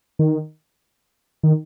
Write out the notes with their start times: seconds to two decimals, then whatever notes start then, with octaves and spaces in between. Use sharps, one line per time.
0.19 D#3
1.43 D#3